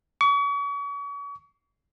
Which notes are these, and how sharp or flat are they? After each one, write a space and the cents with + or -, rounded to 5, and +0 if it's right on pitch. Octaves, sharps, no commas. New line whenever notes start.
C#6 +40